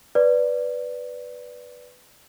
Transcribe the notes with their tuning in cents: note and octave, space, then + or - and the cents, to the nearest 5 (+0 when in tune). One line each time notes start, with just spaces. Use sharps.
B4 +0 D5 -5